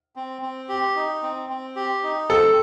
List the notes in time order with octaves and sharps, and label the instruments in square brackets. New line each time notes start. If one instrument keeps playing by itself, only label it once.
[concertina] C4
C4
G4
D#4
C4
C4
G4
D#4
[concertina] C4 [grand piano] A4